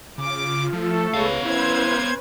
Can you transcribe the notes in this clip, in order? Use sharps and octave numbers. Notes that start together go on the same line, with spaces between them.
C#3 F4 D6
F3 A3 A4
C#2 B3 G#4 B4 C#5 F5
C#4 E4 B4 C5 G#6